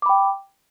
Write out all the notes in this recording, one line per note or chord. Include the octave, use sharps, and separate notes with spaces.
G5 B5 D6